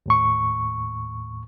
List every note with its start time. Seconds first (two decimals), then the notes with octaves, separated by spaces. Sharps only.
0.06 D#2 A2 C#6